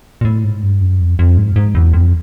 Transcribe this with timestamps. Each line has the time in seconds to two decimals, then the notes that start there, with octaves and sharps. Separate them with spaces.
0.21 A#2
0.25 A2
0.44 G#2
0.63 G2
0.81 F#2
1.00 F2
1.19 F2
1.37 G#2
1.56 G#2
1.75 E2
1.94 F2